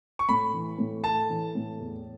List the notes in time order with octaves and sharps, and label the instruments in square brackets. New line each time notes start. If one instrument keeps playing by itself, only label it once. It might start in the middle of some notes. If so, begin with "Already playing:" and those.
[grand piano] C#6
[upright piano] A2 [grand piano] B5
[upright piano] E3
A2
[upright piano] A4 [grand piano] A5
[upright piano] E3
A2
E2